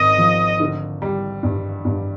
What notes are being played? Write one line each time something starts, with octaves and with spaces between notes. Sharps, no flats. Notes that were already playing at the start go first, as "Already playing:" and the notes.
Already playing: G#1 C#3 D#5
F3
D3
G3
G2
G2